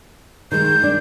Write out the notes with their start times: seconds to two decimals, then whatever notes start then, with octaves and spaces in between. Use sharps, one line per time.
0.52 D#3 G#3 G6
0.84 D4